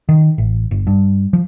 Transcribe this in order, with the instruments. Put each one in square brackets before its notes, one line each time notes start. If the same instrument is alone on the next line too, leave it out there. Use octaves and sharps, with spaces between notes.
[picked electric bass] D#3
A1
G1
G2
F3